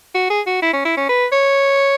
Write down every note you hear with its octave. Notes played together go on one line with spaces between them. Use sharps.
F#4
G#4
F#4
E4
C#4
E4
C#4
B4
C#5